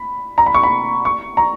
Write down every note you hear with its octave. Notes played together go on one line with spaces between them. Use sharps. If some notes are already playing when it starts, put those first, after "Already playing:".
Already playing: B5
A#5
B5
C#6
B5
C#6
A#5